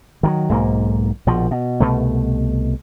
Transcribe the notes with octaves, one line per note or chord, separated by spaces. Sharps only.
D#3 E3 F#3
B1 G#2 A#3
A#1 B2 F3
B2
C2 B2 A3